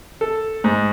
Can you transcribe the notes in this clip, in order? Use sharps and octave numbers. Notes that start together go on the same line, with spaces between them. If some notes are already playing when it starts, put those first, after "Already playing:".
A4
G#2